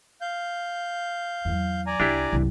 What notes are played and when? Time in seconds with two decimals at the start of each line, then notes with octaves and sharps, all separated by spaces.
0.21 F5 G6
1.45 E2 F#3
1.87 D5 G#5 A#5
2.00 C2 D4 E4 G4
2.33 C2 F#2